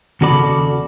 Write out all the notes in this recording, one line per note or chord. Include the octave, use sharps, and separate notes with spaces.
D#2 C#3 F#4 A4 D5 B5